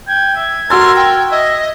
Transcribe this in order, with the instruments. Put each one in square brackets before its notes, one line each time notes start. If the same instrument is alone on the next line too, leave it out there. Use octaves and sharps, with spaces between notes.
[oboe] G5 [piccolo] G#6
[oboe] E5
[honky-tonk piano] F#4 E6 A6 [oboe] A#4 [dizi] C6
[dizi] G5
[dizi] D#5 [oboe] E5